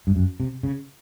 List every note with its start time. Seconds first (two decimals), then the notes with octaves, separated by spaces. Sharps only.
0.07 G2
0.16 F#2
0.40 C3
0.63 C#3